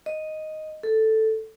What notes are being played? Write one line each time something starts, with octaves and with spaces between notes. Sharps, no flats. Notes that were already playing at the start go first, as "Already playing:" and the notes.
D#5
A4